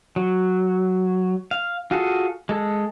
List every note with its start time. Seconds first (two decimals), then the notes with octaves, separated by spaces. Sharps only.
0.16 F#3
1.51 F5
1.91 F4 F#4 G#4 A4
2.49 G#3 A4